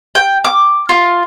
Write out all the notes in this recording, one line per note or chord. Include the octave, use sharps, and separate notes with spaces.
G5
D6
F4